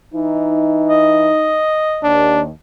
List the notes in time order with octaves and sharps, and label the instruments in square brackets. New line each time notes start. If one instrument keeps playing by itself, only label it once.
[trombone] E3 [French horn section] D#4
[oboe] D#5
[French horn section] D#2 [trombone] D4